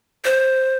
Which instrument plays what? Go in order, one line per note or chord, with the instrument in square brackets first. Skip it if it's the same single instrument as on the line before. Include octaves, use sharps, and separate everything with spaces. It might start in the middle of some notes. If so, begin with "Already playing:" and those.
[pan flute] C5